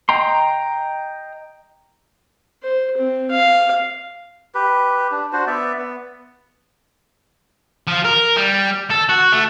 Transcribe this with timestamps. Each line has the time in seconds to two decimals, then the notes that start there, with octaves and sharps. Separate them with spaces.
0.09 D#5 G5 A#5 C6
2.63 C5
2.97 C4
3.30 F5
4.55 G4 B4
5.12 D4
5.33 D4 F#4 C5
5.47 B3 D5 E5
5.78 B3
7.87 F3
8.05 A#4
8.37 G3
8.90 A4
9.09 F#4
9.32 A3